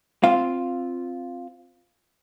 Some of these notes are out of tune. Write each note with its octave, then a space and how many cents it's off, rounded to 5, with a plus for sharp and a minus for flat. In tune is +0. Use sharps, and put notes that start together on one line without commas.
C4 +0 F4 +0 F5 +0